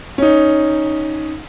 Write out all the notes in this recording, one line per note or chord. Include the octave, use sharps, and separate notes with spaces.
C#4 D#4